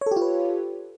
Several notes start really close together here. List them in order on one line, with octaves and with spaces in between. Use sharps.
C#5 A4 G4 F4 B4